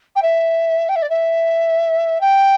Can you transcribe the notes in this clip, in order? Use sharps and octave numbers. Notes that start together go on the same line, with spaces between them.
G5
E5
G5
E5
D5
E5
G5